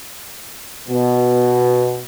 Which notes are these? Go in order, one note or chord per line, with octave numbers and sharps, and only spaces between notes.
B2